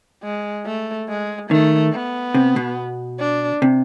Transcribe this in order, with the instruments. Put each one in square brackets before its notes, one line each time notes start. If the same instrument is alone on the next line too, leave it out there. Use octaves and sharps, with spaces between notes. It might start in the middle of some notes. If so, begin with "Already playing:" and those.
[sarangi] G#3
A3
G#3
[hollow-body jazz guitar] D#3 [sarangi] A3
[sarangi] B3
[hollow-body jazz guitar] C3
B2
[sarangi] D4
[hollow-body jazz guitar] C3